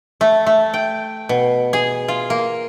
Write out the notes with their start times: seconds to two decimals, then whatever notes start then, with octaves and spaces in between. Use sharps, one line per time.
0.21 A3
0.47 A3
0.74 G5
1.29 B2
1.73 G#4
2.08 F4
2.30 A#3